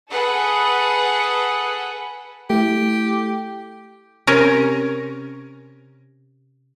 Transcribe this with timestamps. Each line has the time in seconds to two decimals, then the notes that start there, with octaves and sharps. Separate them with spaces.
0.11 G#4 A4 B4 F#5
2.50 A3 E4 G4
4.27 C3 C#4 A#4